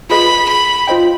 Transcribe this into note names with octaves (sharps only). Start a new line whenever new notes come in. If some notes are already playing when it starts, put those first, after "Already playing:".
F4 G#4 B4 D#5 B5
B5
F4 C5 D#5 G5